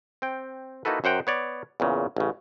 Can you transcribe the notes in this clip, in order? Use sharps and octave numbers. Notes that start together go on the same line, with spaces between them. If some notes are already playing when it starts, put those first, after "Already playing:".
C4 G5
A#3 D#4 E4 F#4 A4 B4
F#2 C5 F#5 G5 A#5
B3 C#5 D5
E2 A#2 C#3
A1 C#3